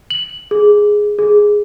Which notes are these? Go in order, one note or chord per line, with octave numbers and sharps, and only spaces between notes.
F#7
G#4
G#4